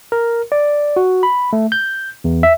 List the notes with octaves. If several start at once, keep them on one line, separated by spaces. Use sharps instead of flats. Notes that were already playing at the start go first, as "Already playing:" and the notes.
A#4
D5
F#4
B5
A3
G6
E2
E5